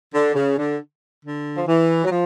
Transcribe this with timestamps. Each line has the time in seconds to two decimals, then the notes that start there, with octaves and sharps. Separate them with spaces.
0.14 D3
0.35 C#3
0.58 D3
1.23 D3
1.56 F3
1.67 E3
2.04 F#3
2.10 F3